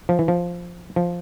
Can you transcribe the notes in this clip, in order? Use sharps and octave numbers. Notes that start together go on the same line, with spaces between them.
F3
E3
F3
F3